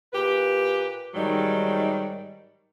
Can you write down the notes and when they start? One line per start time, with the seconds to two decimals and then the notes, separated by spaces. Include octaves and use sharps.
0.13 A#2 G4 B4
1.15 G#2 D#3 F#3 G3